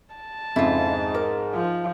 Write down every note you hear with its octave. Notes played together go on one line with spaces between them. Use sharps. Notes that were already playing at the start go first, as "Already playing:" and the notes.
A5
F2 G#2 C#3 E4 F4
A#4 D6
F3